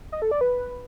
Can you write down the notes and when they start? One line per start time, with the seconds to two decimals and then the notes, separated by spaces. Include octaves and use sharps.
0.12 D#5
0.22 A4
0.31 D5
0.41 B4